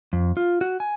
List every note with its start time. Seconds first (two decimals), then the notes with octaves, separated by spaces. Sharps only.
0.13 F2
0.37 F4
0.61 F#4
0.80 G#5